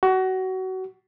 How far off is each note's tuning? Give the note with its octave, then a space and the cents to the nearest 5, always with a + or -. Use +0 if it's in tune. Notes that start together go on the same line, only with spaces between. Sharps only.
F#4 +25